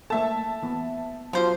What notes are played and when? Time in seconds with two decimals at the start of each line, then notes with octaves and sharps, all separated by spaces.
0.10 A3 A#3 A4 E5 A5
0.63 E3 B3
1.33 F3 F#3 F4 C5